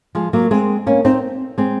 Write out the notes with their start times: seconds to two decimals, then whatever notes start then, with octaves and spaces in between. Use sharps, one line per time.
0.15 F3 G#3
0.33 F#3 A#3
0.51 G#3 C4
0.87 A#3 C#4
1.05 C4 D#4
1.58 G#3 C4